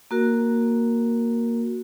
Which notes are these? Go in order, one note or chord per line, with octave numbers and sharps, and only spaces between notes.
A#3 F#4 A#4